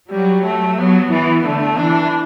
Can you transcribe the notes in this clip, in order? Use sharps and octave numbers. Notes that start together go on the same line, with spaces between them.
F#3 G3
A3
F#3 B3
E3
D3 A3
E3 D4